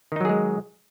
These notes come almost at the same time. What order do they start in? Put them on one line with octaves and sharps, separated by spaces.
D#3 D#4 F#3 G#4 G#3